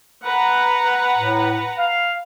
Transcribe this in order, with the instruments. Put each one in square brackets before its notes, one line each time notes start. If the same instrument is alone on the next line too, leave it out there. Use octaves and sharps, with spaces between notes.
[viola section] B4 F#5 A#5
[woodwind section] A2
F5